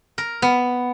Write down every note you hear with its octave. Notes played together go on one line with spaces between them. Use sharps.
A#4
B3